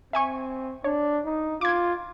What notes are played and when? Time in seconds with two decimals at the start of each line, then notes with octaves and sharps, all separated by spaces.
0.13 C4 E5 G#5 C#6
0.84 D4 C#5
1.25 D#4
1.61 F4 D6 G#6